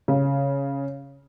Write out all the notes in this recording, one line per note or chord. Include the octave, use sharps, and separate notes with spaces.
C#3